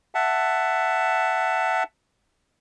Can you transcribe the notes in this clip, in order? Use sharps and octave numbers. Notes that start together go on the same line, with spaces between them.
E5 F#5 A5